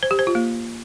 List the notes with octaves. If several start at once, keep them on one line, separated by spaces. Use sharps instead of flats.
C5
G4
C5
F4
A#3